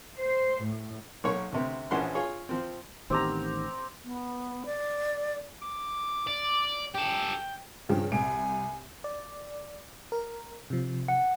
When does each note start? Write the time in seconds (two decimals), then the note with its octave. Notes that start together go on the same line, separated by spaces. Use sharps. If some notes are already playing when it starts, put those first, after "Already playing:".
0.19 C5
0.64 A2
1.24 B1 A#3 C#5
1.52 D2 C3 B3
1.91 A#1 E3 F3 C#4 F#5 C6
2.15 F4 G#4 C#5
2.49 F3 C4
3.10 A1 D#3 B3 C4 G4 A#5
4.04 B3
4.66 D5
5.62 D6
6.27 D5
6.94 G4 A4 G5
7.89 G2 C#3 F3 G5
8.12 C2 G#5 D7
9.04 D5
10.12 A#4
10.70 C3 F3
11.08 F#5